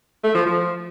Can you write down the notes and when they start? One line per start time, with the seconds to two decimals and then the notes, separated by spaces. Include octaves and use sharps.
0.24 A3
0.35 F3
0.46 F3